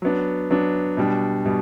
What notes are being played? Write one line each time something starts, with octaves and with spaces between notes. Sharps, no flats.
F#3 B3 D4
F#3 B3 D4
B2 G3 D4
B2 G3